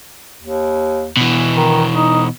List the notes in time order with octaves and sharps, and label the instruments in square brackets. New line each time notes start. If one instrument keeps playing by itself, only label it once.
[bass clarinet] D#2
[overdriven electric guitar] B2 E3
[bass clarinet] D#3
D#4